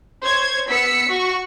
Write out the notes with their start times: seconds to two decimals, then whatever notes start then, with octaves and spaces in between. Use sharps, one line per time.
0.23 C5 C#5 G#6
0.69 B3 E6 B6 C#7
1.09 F#4 C#6